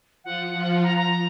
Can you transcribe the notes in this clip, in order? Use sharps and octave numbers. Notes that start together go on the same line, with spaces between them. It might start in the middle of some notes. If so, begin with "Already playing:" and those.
F3 F4 F#5
F3 F4
A#5
A#5